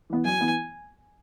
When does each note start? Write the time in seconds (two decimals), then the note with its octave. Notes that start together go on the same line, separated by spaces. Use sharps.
0.10 E3 B3
0.25 F#2 G#5
0.40 E3 B3